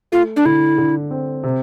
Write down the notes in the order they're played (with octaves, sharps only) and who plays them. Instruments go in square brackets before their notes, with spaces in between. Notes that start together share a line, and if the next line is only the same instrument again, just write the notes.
[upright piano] A3 [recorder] F4
[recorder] D4
[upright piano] D3 [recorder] E4
[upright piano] D3
C4
C3